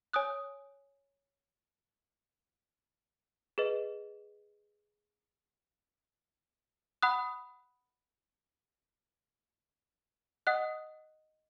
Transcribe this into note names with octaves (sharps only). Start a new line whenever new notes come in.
C#5 G#5 D#6 F#6
G#4 B4 D#5
F#5 B5 D#6 F#6
D#5 F#5 D#6 F#6